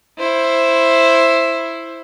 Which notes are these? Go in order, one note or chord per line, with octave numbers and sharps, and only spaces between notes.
E4 C5